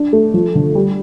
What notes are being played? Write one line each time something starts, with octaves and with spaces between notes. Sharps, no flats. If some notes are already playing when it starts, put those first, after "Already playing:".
Already playing: D4
A3
F3
D3
G3